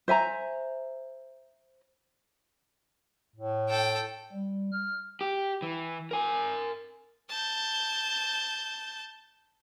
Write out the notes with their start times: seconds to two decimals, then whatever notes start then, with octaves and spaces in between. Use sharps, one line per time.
0.08 C5 E5 G#5 A#5
3.36 A2
3.69 A4 G5
4.33 G3
4.72 F6
5.21 G4
5.62 E3
6.11 A#4 G#5
7.29 A5 G6